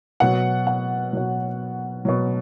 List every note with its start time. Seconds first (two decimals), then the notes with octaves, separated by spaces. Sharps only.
0.20 B2 F#3 F#5
0.67 F#5
1.13 B2 F#3
2.05 B2 F#3